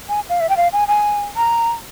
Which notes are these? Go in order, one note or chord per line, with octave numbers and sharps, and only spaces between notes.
G#5
F5
E5
G5
F5
G#5
G#5
A#5